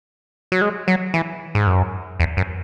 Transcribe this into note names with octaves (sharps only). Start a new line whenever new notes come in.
F#3
G#3
F#3
E3
G#2
F#2
E2
F#2